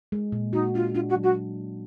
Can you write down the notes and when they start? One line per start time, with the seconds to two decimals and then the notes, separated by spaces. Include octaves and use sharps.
0.12 G#3
0.32 A#2
0.53 D#4 F#4
0.74 D4 F4
0.94 D4 F4
1.09 F#4
1.16 F#3
1.23 F#4